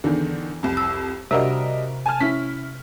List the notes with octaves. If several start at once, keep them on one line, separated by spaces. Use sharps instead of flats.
E2 D3 D#3
C2 F2
E6
C3 G3 D4 F#4 A#4 D#5 E5
G#5 A5 F6
C#4 E4 B6